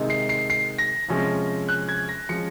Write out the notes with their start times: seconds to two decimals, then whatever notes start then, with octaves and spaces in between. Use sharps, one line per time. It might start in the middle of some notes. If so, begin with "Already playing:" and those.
Already playing: C3 D#3 G#3 D#4
0.10 C7
0.29 C7
0.50 C7
0.78 A#6
1.08 C3 F3 G#3 C#4
1.69 F#6
1.89 G#6
2.09 A#6
2.29 F3 G#3 C#4 C#7